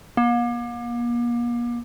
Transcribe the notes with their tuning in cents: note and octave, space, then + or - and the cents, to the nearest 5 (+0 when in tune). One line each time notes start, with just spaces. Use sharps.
A#3 +40